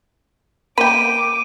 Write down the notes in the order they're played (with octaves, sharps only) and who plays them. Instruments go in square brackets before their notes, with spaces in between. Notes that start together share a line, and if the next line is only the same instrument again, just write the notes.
[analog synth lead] A#3 [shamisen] G5 B5 [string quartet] D6 [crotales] D#7